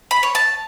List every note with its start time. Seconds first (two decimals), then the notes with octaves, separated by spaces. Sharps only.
0.11 B5
0.23 C#5
0.35 A5